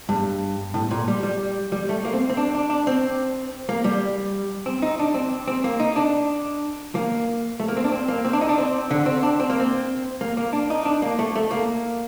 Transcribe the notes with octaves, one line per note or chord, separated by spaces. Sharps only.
G2
A2
A#2
G3
G3
G3
A3
A#3
C4
C4
D4
D4
D4
C4
A#3
G3
C4
D#4
D4
C4
C4
A#3
D#4
D4
A#3
A3
A#3
C4
D4
C4
A#3
C4
D4
D#4
D4
C4
D3
C4
D4
C4
A#3
C4
A#3
A#3
D4
D#4
D4
A#3
A3
A3
A#3